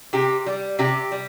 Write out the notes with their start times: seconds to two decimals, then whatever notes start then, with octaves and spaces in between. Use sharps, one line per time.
0.13 C3 G4
0.46 G3
0.79 C3 G4
1.12 G3